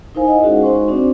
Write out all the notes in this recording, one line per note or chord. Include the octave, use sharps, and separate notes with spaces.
D#4 E4 A#4 C5 F5 G#5
D#5 F#5
G#3 C#4 D#4 F#4 G#4
D#4 C5 C6 C#6
C4 D4 F#4 D5